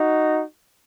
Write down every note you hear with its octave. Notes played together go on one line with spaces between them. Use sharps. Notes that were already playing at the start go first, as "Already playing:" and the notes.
Already playing: D#4 F#4